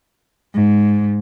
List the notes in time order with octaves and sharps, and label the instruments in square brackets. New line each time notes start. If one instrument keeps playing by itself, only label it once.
[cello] G#2